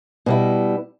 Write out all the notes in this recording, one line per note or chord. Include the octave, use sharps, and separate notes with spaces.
B2 G3 E4